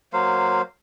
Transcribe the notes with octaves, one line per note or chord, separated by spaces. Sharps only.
F#3 A#3 C5 F5